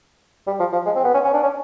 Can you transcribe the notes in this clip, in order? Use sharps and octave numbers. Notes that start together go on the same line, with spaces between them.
G3
F3
F3
G#3
C4
B3
C#4
C#4
D4
C#4